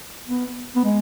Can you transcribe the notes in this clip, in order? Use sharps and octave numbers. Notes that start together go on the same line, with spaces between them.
B3
B3
G#3